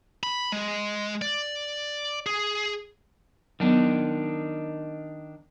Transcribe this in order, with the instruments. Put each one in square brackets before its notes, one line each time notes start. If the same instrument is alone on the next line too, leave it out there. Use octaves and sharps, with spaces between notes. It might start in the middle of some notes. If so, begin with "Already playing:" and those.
[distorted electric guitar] B5
G#3
D5
G#4
[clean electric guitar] D#3 D4 [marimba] F#3 B3